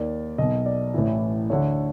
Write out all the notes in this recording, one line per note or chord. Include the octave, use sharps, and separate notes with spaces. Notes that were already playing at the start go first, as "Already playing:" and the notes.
Already playing: D#2 D#3 D5
B1 B2 D#5
D5
A1 A2 E3
D2 D3 C#5